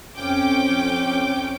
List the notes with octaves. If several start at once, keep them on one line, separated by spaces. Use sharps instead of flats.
F2 C#4 G5 D6